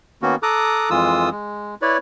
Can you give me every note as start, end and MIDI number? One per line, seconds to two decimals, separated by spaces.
0.22 0.35 51
0.22 0.35 58
0.22 0.35 59
0.22 0.35 61
0.22 0.35 66
0.43 0.90 69
0.43 0.90 82
0.43 0.90 86
0.43 0.90 87
0.43 0.90 90
0.90 1.29 41
0.90 1.29 52
0.90 1.29 56
0.90 1.29 65
0.90 1.29 87
0.90 1.29 88
1.32 1.75 56
1.82 1.97 64
1.82 1.97 71
1.82 1.97 73
1.82 1.97 74